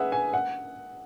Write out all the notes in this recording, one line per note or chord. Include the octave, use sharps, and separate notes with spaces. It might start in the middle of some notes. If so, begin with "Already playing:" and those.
Already playing: G#4 B4 E5 F#5
G#5
F#5